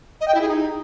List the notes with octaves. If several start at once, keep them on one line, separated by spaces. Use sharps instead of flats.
D#5
G5
E4
G#4
D#4